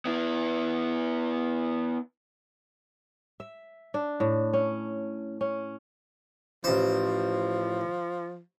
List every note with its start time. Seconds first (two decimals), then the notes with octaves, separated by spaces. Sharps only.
0.05 B3 E4
3.40 E5
3.94 D4
4.20 A2
4.53 C#4
5.41 C#4
6.64 A1 F3 C5